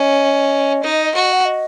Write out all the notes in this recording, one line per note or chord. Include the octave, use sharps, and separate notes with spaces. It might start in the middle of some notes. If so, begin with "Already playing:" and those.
Already playing: C#4 D#5
D#4
F#4
F#5
D#5